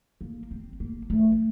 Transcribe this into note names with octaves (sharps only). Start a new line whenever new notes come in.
A#3
C4
A#3
A3